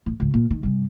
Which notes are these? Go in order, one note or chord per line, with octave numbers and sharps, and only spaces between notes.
A1
C#2 G#2
A#2
D#3
G2 C3